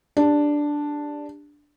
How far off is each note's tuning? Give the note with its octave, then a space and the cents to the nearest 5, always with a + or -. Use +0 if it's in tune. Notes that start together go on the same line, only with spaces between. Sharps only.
D4 +0 G4 +30